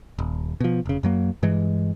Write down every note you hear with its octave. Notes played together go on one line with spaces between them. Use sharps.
D#1
B2 F3
F1 C#3
F#2 F#3 A#3
G2 E3 G#3